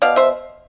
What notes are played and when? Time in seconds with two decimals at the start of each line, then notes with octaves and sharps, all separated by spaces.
0.02 B2 D5 F5
0.16 C5 E5